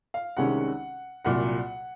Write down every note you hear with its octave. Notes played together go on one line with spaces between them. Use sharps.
F5
C2 C3 D#3 G#3 C#4 F#5
C2 A#2 F#3 F#5